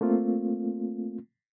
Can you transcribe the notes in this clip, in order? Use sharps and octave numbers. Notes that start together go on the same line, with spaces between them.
A3 A#3 C4 F4